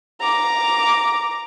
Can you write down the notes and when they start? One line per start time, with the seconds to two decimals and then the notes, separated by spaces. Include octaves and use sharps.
0.21 A#5 D6